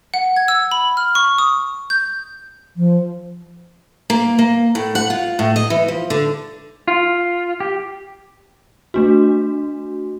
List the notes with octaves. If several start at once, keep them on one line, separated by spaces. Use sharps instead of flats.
F#5
G#6
E6
B5
F6
C#6
D#6
G6
F3
A#3
A#3
A2
F#5
F4
A2
D#5
E3
F3
D3
F4
G4
A3 D4 F#4